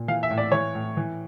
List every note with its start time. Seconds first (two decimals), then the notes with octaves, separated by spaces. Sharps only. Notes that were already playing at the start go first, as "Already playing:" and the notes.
Already playing: A#2
0.08 E3 F5
0.23 E5
0.31 A2
0.38 D5
0.52 E3 C#5
0.75 A2
0.97 E3